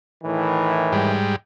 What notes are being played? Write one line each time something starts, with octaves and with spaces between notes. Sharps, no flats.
A2 D#3 E3
G#2 G3